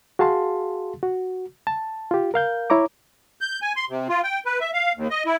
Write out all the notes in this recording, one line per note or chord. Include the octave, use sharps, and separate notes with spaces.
F#4 G#4 F5 A5 C6
F#4
A5
F4 G4
A#4 F5 G6
E4 C#5 A#5 D6
G6
G#5
C6
C3
F4
G5
B4
E5
F5
D#2
D#5
E4